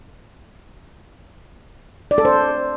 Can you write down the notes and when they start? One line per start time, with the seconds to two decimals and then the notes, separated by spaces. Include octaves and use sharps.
2.11 D5
2.18 A4
2.25 C5